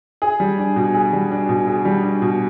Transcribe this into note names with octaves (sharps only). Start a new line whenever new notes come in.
G#4
G3
D4
B2
G#4
G3
D4
B2
G#4
G3
D4
B2